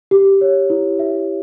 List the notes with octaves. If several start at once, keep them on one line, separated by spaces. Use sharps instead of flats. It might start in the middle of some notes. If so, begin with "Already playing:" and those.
G4
C#5
E4
E5